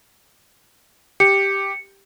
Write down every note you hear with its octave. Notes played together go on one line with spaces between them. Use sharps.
G4 C#7